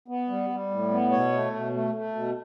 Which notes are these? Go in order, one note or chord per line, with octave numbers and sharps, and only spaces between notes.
B3
G3
G3
A2
B3
B2 C#5
A3
B2
A3
A3
B2